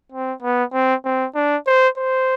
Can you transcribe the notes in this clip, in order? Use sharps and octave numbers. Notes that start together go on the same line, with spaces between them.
C4
B3
C4
C4
D4
C5
C5